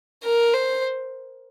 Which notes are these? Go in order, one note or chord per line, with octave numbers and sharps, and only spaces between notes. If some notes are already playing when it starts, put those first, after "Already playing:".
A#4
C5